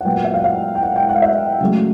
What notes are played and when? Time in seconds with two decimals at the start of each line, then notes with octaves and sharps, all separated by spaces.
0.01 F#5
0.05 A#2 F#3 B3 G5
0.14 F#5
0.24 E5
0.34 F5
0.39 F#5
0.44 F5
0.75 G5
0.83 F#5
0.96 G5
1.09 F#5
1.15 F5
1.22 E5
1.61 C#3 F#3 A3